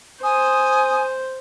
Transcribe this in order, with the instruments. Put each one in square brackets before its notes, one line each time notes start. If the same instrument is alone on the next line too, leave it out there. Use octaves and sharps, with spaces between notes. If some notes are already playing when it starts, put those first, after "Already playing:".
[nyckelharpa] C5 [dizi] G#5 [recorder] D#6